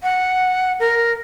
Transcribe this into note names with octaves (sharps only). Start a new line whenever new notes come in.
F#5
A#4